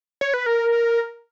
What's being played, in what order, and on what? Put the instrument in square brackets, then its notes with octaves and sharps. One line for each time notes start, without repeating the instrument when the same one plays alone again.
[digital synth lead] C#5
B4
A#4